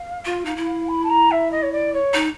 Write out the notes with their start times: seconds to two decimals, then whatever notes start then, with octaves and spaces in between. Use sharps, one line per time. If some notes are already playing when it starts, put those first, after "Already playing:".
Already playing: F5
0.25 F4
0.45 D#4
0.56 E4
0.88 B5
1.04 A5
1.09 A#5
1.31 E5
1.51 D#5
1.62 C#5
1.72 D5
1.93 C#5
2.14 D#4